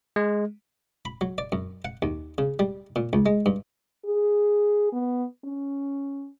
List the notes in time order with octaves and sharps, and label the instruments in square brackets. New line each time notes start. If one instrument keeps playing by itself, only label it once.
[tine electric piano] G#3
[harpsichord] B5
F#3
D5
F#2
F#5
D#2
C#3
G3
A#2
C#2
G#3
G2
[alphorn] G#4
B3
C#4